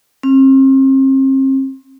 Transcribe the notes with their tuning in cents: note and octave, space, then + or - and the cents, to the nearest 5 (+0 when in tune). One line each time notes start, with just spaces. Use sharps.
C4 +40